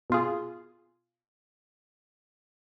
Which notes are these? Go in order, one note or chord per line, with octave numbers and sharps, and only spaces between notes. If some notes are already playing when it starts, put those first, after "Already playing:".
B2 F4 G#4